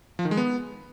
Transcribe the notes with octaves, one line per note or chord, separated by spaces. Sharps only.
F3
D#3
G#3
B3